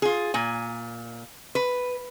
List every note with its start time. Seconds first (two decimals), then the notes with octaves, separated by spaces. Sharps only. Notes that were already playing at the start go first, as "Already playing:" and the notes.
0.02 F4 G#4
0.34 A#2 G#5
1.55 B4